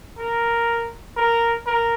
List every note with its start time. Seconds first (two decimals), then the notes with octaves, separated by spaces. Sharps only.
0.18 A#4
1.17 A#4
1.66 A#4